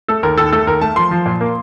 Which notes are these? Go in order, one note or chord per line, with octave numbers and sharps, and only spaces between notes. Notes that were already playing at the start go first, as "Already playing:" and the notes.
A3 A4
D#2 A#4
D#2 A4
A3 A4
D#2 A#4
A3 A5
F3 C6
F3
A#2
A#3